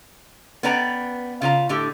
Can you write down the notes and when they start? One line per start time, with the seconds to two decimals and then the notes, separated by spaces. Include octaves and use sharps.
0.63 B3 C#4 B4 D5 G5 A#5
1.42 C#3 F4 F5 A#5
1.69 A2 D3 G4